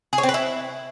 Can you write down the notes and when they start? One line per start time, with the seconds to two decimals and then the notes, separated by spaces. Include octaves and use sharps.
0.13 G#4
0.18 C#5
0.23 C4
0.29 B4
0.34 E4